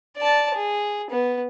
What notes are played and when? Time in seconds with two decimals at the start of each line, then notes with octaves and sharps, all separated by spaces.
0.18 D5 A5
0.55 G#4
1.11 B3